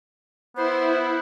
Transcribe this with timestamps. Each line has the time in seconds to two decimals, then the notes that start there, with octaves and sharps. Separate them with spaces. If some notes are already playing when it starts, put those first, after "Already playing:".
0.56 B3 E4 C5